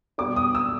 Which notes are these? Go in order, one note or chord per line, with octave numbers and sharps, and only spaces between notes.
B2 G3 B3 D4 D6
D#6
E6